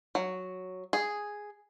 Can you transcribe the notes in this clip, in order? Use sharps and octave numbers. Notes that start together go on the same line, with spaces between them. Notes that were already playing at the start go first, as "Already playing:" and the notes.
F#3
G#4